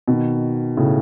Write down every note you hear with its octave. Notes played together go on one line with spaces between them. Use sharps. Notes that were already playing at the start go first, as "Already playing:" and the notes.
B2 D#3
A2 C#3